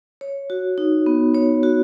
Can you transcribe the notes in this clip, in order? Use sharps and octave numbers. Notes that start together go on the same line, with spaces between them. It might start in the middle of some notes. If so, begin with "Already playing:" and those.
C#5
F#4
D#4
B3
C#5
F#4